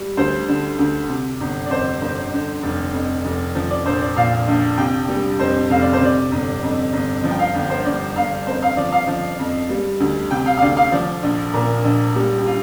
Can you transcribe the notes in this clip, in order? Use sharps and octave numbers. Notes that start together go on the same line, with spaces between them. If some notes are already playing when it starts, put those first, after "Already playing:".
Already playing: G3
D2 C5
D3
D2
C3
G1
D5
F2 C5
G1 C5
D3
F1
F2
F1
F3
D5
A#1 C5
D5
A#2 F5
A#1
C3 G5
G3
F2 C5
F1 F5
D5
C5
C3 D5
G1
F2
G1
F3
G5
F5
G1
C5
G2 D5
G1 F5
F2 C5
F5
F3 D5
F5
F3
F2
G3
D2
C3 G5
F5
F5
D2 D5
F5
F3 D5
A#1
A#2 A#4
A#1
G3 G4
G4
F4